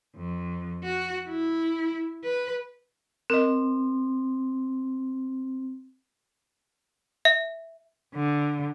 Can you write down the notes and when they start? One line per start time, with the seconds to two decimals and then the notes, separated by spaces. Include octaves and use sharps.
0.16 F2
0.84 F#4
1.29 E4
2.24 B4
3.30 C4 A#4 D#5
7.25 E5
8.15 D3